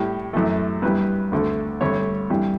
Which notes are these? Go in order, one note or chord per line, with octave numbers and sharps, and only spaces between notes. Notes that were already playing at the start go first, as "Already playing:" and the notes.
Already playing: A2 G3 G4
F#2 E3 A3
G2 E3 G3 B4
D2 D3 A3
G2 D3 A3 C#5
G2 E3 G3